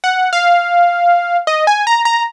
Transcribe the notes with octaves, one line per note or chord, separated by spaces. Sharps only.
F#5
F5
D#5
G#5
A#5
A#5